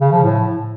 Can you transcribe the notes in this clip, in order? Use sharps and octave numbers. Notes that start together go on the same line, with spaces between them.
C#3
F3
A2